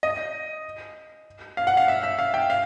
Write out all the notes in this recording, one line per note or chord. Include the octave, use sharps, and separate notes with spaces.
D#5
F5
F#5
F5
E5
E5
F5
G5
F5